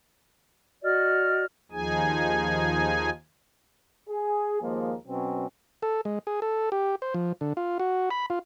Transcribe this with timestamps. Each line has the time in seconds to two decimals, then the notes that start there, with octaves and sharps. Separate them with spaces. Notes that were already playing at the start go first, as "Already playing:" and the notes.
0.84 F#4 D5 D#5 F6
1.72 D#2 F3 D#4 G#4 G#5
4.09 G#4
4.61 D#2 F3 G#3 A#3
5.07 B2 F#3 C4 C#4
5.83 A4
6.05 G#3
6.27 G#4
6.42 A4
6.72 G4
7.02 C5
7.14 F3
7.41 D3
7.57 F4
7.80 F#4
8.10 B5
8.30 F4